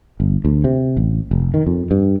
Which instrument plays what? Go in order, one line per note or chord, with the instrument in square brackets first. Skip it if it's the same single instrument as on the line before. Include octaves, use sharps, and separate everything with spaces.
[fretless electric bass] G1
D2
C3
A1
F1
D#3
F2
G2